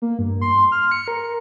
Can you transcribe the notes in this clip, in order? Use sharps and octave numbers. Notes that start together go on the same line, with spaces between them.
A#3
G2
C6
F6
C#7
A#4